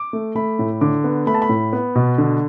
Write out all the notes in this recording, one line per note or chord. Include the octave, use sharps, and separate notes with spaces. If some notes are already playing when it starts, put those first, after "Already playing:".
Already playing: D6
A3
A3 B5
A2
D3 D6
B3
A3 B5
A5
B5
A2
B3
B2
D3